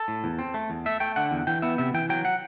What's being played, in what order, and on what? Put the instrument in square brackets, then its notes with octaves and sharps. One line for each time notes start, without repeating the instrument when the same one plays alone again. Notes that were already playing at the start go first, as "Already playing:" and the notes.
Already playing: [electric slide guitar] A4
A2
E2
C4
A3
E2
A3 E5
A3 G5
D3 F#5
E2
E3 G5
B3 E5
C3 E5
E3 G5
F#3 G5
F#5